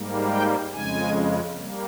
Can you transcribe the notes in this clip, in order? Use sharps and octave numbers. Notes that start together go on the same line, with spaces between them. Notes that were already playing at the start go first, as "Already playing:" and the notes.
Already playing: G#2 G3 A#3
G5
F2 C#3 G#3 G#5
G3 A#3